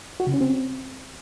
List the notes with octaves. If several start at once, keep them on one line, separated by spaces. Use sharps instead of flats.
F#4
C#3
C#4
C4